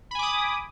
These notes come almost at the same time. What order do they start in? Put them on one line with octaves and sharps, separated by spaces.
B5 G#5 D6 D#6